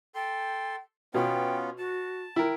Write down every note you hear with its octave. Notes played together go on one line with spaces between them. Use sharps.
A4 G5 C6
B2 B3 C#4 F4 G5
F#4 A5
E4 A#4 G5